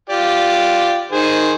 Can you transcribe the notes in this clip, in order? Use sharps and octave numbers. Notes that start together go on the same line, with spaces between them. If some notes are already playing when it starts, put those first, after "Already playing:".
F4 G4 D5
D#3 G#4 C5